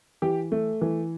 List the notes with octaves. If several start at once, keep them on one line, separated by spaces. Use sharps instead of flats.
E3 G4
A3
E3